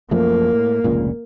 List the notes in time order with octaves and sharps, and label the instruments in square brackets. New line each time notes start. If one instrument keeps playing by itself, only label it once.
[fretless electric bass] F#2 F3 A3 [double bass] A#3
[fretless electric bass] A2
F1 C#2 A#2